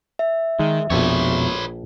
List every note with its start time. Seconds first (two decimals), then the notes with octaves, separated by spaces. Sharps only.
0.19 E5
0.59 D#3 G#3
0.90 A#1 F2 B2 A4 B4 C#5 G5